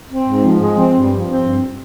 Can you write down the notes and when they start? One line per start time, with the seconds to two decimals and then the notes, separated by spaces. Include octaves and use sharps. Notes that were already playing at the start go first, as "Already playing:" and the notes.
0.10 C4
0.27 G#2
0.44 F3
0.60 G#3
0.77 C4
0.94 G2
1.11 F3
1.28 C4
1.45 G2